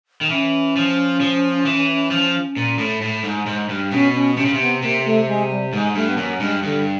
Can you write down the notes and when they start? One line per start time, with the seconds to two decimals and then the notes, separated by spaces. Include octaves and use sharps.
0.21 D#3
0.30 E3 C#4
0.76 F3
1.21 F3
1.66 E3
2.11 F3
2.57 A#2
2.78 A2
3.02 A2
3.24 G#2
3.46 G#2
3.69 G2
3.92 B2 C#4
4.15 C#4
4.37 C3 C#4
4.45 C#3
4.54 C3
4.60 B3
4.82 C3 A#3
5.05 A3
5.27 G#3
5.50 G3
5.73 G#2 G#3
5.95 G2 A3
6.08 B3
6.17 F#2 A#3
6.40 G2 G#3
6.63 G2 D3